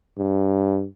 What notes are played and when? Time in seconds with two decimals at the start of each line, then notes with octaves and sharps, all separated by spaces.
0.17 G2